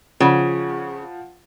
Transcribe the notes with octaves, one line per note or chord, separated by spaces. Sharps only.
C#3 F3 F#5